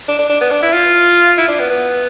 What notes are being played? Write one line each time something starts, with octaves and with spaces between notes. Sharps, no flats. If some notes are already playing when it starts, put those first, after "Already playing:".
D4
D4
D4
B3
D4
E4
F4
E4
D4
B3
B3